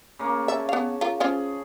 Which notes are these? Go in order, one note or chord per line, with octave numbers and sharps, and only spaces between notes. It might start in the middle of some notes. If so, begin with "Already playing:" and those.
C#3 A#3
E5 A5
B3 F5
F4 A#4
C#4 F4 G#4 C5